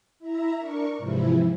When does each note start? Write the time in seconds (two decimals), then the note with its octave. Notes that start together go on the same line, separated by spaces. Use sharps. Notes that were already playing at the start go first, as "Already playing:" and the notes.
0.19 E4 E5 A#5
0.58 D4 A#4 C#6
0.98 G#2 C3 E3 F3 E4